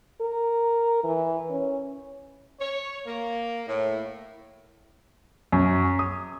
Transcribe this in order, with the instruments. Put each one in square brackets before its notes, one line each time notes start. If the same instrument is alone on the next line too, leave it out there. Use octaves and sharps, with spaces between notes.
[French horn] A#4
E3
C#4
[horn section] C#5
A#3
A2
[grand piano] F#2
D#6